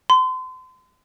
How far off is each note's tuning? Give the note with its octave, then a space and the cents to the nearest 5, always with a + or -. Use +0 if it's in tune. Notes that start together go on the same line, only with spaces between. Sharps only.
C6 -35